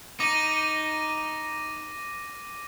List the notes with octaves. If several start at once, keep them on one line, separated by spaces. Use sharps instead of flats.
D#4 D6 A#6 D#7